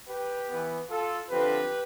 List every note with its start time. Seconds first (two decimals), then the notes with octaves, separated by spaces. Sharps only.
0.08 G4 B4
0.50 E3 B3
0.89 F4 A4
1.30 D3 F3 C4 G4 B4